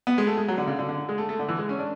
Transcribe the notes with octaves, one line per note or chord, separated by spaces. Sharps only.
B3
G#3
A3
G#3
F#3
D3
C#3
D3
D3
G#3
A3
A3
D3
E3
G#3
C#4
D4